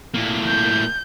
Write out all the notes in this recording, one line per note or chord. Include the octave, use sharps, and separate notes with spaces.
A2 A#3
G6